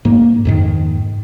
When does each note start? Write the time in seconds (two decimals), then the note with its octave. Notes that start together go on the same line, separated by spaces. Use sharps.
0.05 G#2 A#3
0.45 F2 G#2 D#3